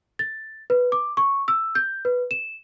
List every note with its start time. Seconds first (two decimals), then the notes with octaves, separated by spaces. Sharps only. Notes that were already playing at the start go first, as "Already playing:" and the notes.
0.19 A6
0.70 B4
0.92 D6
1.17 C#6
1.48 E6
1.75 G6
2.05 B4
2.31 E7